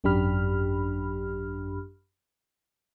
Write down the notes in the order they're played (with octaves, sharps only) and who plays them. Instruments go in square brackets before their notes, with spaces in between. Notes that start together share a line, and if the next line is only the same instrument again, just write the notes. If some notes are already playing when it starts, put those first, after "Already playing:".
[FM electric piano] G#1 F#2 D4 G4 B5 F6